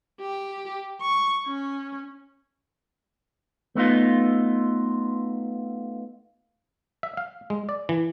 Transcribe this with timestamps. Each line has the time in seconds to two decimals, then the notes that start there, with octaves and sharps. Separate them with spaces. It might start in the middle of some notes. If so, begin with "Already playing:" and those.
0.20 G4
1.01 C#6
1.47 C#4
3.75 A3 B3 D#4 F4
7.03 E5
7.17 F5
7.50 G#3
7.69 D5
7.89 E3